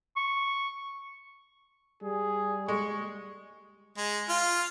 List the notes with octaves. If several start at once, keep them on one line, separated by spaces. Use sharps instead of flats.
C#6
G3 G#4
G#3 C#6
G#3
F4